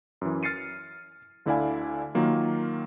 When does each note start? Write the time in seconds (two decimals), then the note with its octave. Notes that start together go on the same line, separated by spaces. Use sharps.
0.21 F#2 E3
0.43 F6 A6 C7 C#7 D#7
1.46 D2 D3 E4 D5 F5 G#5
2.15 D#3 F#3 A#3 F4